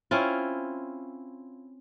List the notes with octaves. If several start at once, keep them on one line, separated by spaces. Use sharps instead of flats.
C4 C#4 E4 F4